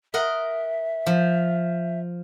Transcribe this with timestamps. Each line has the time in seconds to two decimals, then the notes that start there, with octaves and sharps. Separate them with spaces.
0.14 A#4 D#5 E5 F#5
1.06 F3